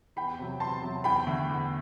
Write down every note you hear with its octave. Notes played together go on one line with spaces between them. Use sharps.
E2 G5 B5
C3 F#3
E2 A5 C6
C3 F#3
E2 G5 B5
D3 A3
E2